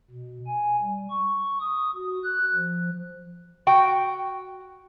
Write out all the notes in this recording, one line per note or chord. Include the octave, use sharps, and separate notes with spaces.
B2
G#5
G3
C#6
D#6
F#4
F#6
F3
F#4 G5